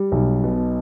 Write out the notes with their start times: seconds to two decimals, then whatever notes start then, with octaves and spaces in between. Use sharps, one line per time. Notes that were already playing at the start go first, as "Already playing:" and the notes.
Already playing: G3
0.12 B1
0.44 B2